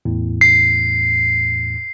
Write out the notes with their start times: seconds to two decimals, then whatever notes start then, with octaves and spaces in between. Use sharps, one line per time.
0.05 E2 A2
0.41 C7